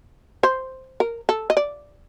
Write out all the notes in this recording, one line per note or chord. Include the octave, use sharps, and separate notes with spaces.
C5
A#4
A4
D#5
D5